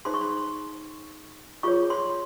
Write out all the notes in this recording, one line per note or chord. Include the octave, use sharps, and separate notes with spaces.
D#4 G#4 C5 C6
C#6
C6
F4 G#4 C#5 C#6
C6